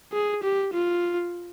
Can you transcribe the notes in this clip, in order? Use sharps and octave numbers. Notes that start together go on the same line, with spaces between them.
G#4
G4
F4